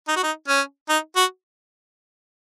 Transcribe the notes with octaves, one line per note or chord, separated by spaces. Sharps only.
D#4
F#4
D#4
C#4
D#4
F#4